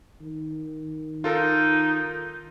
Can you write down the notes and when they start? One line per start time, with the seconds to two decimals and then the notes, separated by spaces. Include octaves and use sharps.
0.21 D#3
1.24 D#4 F4 A4 A#4